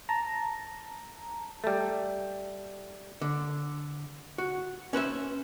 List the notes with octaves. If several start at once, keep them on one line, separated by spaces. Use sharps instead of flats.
A5 A#5
G3 A3
D3
F#4
C#4 B4 C5 E5